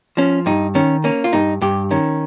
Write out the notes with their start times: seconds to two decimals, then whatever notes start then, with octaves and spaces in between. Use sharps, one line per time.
0.17 F3 C#4
0.46 G2 D#4
0.75 D#3 C#4
1.04 A#3 C#4
1.24 F4
1.33 G2 D#4
1.61 G2 G4
1.91 D#3 C#4